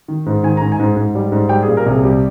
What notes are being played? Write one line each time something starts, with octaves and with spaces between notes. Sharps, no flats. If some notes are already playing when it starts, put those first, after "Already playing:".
D#3
G#2
D#3 G#5
G#2 A#5
G#5
G#2
G#2
G3
G#2
G3 G5
G#4
A#2
A#4
C2 G#4
G3 G4